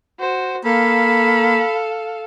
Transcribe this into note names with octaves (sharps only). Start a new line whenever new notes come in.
F#4 C5
A#3 A4 F5 B5